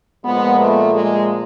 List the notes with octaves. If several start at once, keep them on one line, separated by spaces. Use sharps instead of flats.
A#2 F3 G#3 B3
A3
G#3